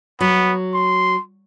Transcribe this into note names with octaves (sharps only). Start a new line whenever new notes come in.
F#3 B3
C6